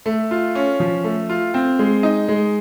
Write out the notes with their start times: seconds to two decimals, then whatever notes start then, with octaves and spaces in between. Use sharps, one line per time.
0.06 A3
0.31 F4
0.55 C#4
0.80 F3
1.04 A3
1.29 F4
1.54 C4
1.79 G#3
2.03 D#4
2.28 G#3